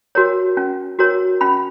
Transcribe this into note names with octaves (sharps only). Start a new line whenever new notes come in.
F#4 A#4 C#5
C#4
F#4 A#4 C#5
C#4 B5